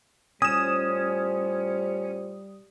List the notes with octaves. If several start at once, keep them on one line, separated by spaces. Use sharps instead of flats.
A2 G3 C#4 F4 C5 D#6 E7